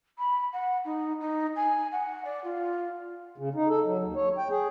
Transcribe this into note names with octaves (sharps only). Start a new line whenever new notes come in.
B5
F#5
D#4
D#4
G#5
F#5
D5
F4
C#3
D#4
A4
F#3
D#2
C#5
G5
G#4